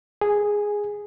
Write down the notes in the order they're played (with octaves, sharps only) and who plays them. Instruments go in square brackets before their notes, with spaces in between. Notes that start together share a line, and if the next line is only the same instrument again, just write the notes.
[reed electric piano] G#4